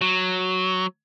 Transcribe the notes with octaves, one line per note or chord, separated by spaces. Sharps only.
F#3